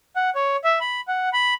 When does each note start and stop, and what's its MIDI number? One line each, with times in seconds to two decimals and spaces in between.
0.16 0.30 78
0.35 0.56 73
0.64 0.79 76
0.80 1.01 83
1.08 1.29 78
1.33 1.54 83